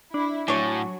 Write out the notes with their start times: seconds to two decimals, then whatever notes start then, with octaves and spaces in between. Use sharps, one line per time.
0.14 D4 E4
0.48 A2 F#3 D4 F#4 C#5 G#5